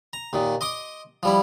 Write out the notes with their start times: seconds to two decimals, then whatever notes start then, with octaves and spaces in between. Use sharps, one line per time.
0.13 A#5
0.33 D#2 A#2 D#3
0.61 D#5 C6 D6 D#6
1.23 F3 G3 E4